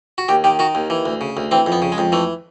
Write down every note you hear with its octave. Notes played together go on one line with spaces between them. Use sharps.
F#4
D#2 G4
D#3 G4
D#3 F#4
D#2
E3
D2
C#3
D2
E3 C4
F2
B3
C#3
G#3
F2
E3 A3